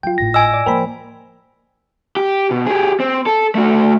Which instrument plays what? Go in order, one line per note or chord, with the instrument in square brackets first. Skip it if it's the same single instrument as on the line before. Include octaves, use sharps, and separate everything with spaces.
[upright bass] F#3 [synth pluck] F4 G5
[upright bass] G#1 [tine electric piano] A2 A#6
[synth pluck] D#5 [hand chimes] G#5 E6
[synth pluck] D5
[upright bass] F3 A#3 [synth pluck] A#4 C5 B5 [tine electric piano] G5
[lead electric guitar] G4
B2
G4 G#4
C4
A4
A3 F#4